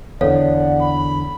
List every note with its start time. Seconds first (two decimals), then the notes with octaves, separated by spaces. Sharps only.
0.21 E2 D3 A4 C#5 D5 F5 F#5
0.81 B5